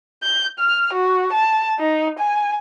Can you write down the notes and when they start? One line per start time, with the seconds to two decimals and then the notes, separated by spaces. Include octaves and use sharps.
0.24 G6
0.59 F6
0.93 F#4
1.33 A5
1.80 D#4
2.19 G#5